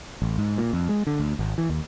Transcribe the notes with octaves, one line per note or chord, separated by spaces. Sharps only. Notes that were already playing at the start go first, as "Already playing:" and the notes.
A1
G#2
A#2
F2
G#3
D3
D2
G#1
E3
D#2